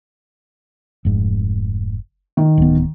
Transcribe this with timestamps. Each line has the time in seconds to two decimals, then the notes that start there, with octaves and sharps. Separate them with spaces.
1.05 F1 G#2
2.37 D#3
2.58 D1 B3